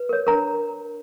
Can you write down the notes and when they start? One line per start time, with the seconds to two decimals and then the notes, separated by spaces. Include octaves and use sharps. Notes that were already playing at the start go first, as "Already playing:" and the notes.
Already playing: B4
0.09 A#4 C#5
0.27 D4 A#4 A#5